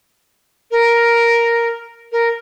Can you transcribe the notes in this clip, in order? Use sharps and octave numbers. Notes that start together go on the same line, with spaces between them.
A#4
A#4